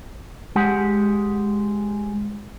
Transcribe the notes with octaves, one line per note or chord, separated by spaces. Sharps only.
G#3 G4 F#5